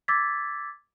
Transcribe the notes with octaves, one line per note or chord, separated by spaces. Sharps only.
D6 E6 G#6 A6 B6